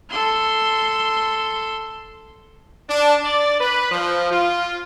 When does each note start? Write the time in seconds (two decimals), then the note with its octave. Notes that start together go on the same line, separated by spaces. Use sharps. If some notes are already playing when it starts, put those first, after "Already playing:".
0.10 A4 C6
2.89 D4
3.24 D5
3.60 B4
3.91 F3
4.31 F4